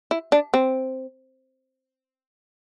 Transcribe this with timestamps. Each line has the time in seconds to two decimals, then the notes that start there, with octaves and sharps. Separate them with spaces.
0.11 E4
0.32 D4
0.54 C4